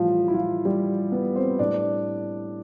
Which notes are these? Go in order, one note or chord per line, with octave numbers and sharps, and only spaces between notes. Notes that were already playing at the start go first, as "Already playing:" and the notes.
Already playing: A2 E3 F3 G3 F4
E4
F3 F4
G3 G4
B3 B4
C4 C5
A2 G3 D4 D5